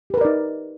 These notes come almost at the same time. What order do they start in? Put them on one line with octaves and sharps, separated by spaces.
G4 B4 A#4 D5 D#4